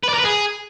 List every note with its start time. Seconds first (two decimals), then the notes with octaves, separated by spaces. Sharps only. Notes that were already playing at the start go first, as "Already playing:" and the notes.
0.03 B4
0.09 D5
0.14 A#4
0.19 B4
0.24 G#4